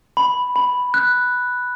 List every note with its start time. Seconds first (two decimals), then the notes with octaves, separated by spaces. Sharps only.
0.17 B5
0.56 B5
0.94 F#6